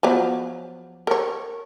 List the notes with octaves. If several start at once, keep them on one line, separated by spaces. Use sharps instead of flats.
F3 F#3 B3
A#4 C#5